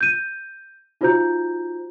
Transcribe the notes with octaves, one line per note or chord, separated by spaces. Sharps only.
G6 D#7
D#4 F4 F#4 C5 A#5 G6